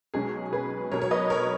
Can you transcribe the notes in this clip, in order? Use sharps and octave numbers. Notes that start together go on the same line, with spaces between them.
B1 B2 G#3 C#4 G#4
G#4 B4
B1 B2 F#3 A#4 C#5
C#5
B4 D#5
A#4 C#5